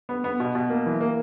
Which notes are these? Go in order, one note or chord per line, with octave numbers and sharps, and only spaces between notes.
B3
B3
B2
B2
A#3
E3
A#3